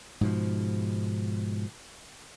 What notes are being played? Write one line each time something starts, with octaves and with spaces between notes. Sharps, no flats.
G#2 B2 F3